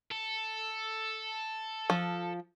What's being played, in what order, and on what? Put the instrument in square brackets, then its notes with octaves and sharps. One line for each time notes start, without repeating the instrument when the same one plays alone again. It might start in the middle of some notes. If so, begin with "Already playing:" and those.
[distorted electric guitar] A4
[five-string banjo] F3